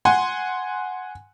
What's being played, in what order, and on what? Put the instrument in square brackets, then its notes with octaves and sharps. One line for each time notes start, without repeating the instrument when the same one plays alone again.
[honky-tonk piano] F#5 G#5 C6